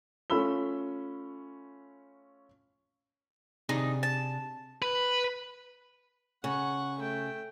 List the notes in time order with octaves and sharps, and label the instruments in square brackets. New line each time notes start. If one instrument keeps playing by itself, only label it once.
[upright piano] A3 C#4 F4 B5 E6 G7
[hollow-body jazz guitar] C3 D4 G#4 [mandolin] D#4
[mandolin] A5
[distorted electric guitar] B4
[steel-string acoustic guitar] C#3 [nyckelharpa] F#5 C#6
[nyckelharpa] A3 G5